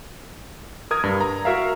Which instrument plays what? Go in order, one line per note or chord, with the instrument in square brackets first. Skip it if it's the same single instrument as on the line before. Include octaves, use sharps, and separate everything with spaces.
[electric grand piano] A#4 D#6 G#6
G2
A#5
F#4 A#4 E5 F5